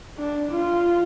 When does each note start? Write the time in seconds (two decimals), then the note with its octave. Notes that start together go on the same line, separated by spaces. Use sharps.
0.18 D4
0.51 F4